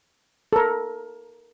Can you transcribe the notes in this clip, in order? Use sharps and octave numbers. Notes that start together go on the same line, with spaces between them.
A4 A#4